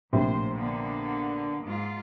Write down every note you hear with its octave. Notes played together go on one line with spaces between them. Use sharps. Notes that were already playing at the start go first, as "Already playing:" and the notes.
A#1 A2 C3 C5
D3 A#3 B3
G#2 F4